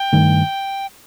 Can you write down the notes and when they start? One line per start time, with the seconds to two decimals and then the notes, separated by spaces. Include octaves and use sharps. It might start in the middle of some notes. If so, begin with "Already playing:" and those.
Already playing: G5
0.13 G2 D#3 A3